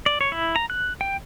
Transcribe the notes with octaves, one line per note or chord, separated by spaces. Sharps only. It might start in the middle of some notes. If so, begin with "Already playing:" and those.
D5
C#5
E4
A#5
F#6
G5